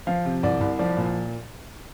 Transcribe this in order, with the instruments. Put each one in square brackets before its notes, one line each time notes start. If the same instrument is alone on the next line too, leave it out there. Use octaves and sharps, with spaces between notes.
[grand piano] F3 F5
C3
C2 D5
C2
F3 D5
A#2